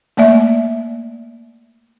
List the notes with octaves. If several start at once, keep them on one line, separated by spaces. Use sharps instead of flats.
A3 A#3 D5 E5